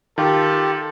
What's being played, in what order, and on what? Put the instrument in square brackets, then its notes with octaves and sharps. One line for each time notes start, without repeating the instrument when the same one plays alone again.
[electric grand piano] D#3 [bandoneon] F4 G4 [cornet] A4